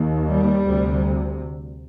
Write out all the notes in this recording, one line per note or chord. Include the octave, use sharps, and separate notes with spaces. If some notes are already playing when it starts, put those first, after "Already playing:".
Already playing: D#2
G3
D2 C3